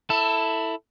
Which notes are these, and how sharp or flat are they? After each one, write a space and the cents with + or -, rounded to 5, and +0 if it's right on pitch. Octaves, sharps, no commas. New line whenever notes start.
E4 +0 A4 +15